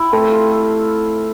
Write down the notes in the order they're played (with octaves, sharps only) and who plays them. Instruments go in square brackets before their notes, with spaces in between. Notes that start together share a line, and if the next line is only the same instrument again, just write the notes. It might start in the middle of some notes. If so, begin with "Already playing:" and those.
Already playing: [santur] E4 G4
[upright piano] A3 [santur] C4
[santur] F4
A4